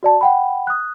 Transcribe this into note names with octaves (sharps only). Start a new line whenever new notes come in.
F#4 D5 A5
F#5 G5 B5
D#6 F#6